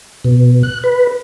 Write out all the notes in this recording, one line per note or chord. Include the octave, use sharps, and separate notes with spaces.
B2
F#6
B4